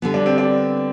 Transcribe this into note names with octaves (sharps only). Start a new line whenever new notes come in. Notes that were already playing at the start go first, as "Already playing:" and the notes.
D3 G3 B3
D4
C4
D4